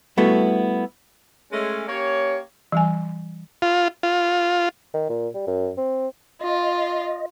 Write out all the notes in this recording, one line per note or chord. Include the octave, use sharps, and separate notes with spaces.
G3 A3 B3 E4 F#4 A4
G#3 A3 C#4
A#3 C#4 G4 C#5
E3 G3 G#5
F4
F4
D#3
A#2
G3
F#2
C4
F4 D#5